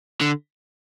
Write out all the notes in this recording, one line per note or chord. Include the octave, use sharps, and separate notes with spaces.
D3